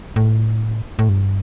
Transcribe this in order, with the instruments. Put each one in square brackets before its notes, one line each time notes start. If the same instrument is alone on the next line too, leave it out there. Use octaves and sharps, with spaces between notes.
[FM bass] A2
A2
G2